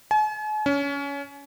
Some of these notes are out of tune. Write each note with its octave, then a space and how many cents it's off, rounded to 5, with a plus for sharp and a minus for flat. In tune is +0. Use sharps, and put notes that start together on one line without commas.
G#5 +45
C#4 +25